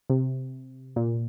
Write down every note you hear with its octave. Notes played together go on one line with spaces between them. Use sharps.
C3
A#2